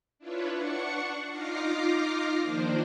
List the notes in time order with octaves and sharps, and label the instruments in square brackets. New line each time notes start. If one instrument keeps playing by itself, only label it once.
[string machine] D4 E4 F4 B4 C#5
D4 F#5 C#6 C#7
D#4 F4 D6 F6 A#6 C7
D#3 F3 A#3 D4 C5